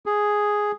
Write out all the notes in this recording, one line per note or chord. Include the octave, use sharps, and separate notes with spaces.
G#4